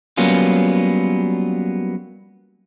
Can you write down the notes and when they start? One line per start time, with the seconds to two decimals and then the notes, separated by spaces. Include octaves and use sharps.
0.17 F#3 G3 A#3 B3 C#4 F4